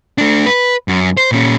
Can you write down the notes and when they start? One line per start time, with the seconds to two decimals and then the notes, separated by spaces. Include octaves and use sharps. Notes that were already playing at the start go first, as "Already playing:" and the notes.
0.18 A3 D4
0.46 B4
0.88 F#2
1.17 C5
1.32 A#2 C#4